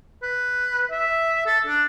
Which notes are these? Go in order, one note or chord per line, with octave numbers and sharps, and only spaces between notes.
B4
E5
A4
D4